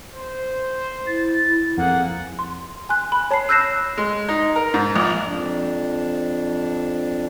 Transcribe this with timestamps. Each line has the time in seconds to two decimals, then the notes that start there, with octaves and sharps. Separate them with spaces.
0.15 C5
1.07 E4 A6
1.77 F2 A#3 G#4 F#5
2.39 C6
2.89 G#5 C6 F#6
3.12 B5
3.31 C#5 A5 B5 C7
3.49 E6 F#6 G6 A#6 C7 E7
3.97 G#3
4.28 D#4
4.56 A#4
4.74 G#2
4.95 A#1
5.27 F2 D4